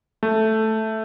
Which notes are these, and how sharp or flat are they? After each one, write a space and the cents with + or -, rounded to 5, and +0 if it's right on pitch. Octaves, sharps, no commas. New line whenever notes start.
A3 +0